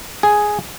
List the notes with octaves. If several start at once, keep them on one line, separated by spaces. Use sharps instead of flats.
G#4